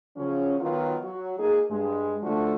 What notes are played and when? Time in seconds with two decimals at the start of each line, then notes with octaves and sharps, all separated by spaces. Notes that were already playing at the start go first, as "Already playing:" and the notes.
0.17 C#3 F3 F#3 C#4
0.60 D#3 F#3 B3 F4
1.02 F#3 F#4
1.39 A#3 D#4 G#4
1.70 G2 G#3
2.23 D3 F3 A3 D4 F#4